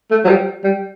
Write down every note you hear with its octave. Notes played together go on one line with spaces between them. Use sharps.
A3
F#3
G3
G3